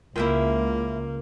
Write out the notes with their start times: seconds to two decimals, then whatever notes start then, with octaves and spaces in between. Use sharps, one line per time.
0.16 C#2 A#3 E4 F4 A#4 E5 G5